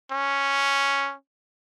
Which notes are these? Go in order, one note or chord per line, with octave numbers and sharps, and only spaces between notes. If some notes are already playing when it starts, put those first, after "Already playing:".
C#4